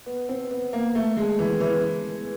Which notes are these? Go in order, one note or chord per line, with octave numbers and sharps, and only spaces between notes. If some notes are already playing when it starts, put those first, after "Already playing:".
B3
C4
B3
A#3
A3
G#3
E3
E3